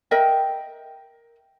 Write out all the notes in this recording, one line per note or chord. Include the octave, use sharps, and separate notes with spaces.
A#4 D#5 E5 G5